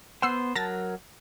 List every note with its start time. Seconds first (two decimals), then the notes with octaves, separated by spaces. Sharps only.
0.22 B3 C5 F#5 E6 C7
0.55 F#3 A#4 A5 A6 A#6